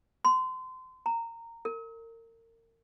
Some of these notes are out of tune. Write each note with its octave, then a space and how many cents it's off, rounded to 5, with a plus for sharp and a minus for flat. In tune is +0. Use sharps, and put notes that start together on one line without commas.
C6 -30
A#5 -15
A#4 -35